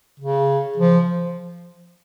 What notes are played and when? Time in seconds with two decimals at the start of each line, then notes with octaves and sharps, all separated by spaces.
0.20 C#3
0.77 F3